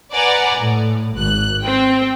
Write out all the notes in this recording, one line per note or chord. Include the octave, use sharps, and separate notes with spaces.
B4 D5 F#5 G#5 A#5
A2
G#1 F#6
C4 G5